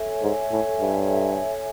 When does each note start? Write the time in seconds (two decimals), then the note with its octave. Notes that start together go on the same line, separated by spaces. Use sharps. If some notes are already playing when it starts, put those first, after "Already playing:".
Already playing: A4 C#5 E5 G#5
0.22 G#2
0.51 A2
0.81 G2